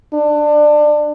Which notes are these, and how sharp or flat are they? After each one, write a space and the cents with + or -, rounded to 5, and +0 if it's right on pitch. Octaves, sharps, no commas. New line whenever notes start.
D4 +20